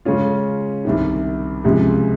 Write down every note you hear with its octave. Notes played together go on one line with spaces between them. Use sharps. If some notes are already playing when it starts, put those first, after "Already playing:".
C#3 G#3 C#4 F4
C2 C3 D#3
C#2 C3 F3 G#3